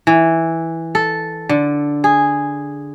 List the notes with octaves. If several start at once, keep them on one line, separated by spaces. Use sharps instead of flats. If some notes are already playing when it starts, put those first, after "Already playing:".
E3
A4
D3
G#4